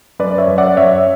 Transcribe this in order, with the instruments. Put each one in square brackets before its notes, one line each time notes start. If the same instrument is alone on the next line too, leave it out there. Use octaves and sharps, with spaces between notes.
[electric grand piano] F#2 B4 D5
C#5 E5
F#2
D5 F#5
F#2 C#5 E5